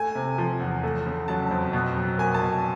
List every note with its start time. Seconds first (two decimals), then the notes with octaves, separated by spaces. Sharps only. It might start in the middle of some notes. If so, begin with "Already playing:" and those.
Already playing: A3 G#5
0.15 C3
0.38 F3
0.60 E2
0.83 A3
1.06 C#3
1.28 F#3 A5
1.51 F2
1.73 B2
1.97 F#3
2.18 A#3 G#5
2.34 A5
2.42 B2